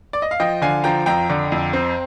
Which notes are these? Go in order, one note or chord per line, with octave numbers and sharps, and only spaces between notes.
D5
D#5
F5
F3 D#5 G5
D3 F5 G#5
F3 G5 A#5
F2 G5 A#5
D3
F2
C4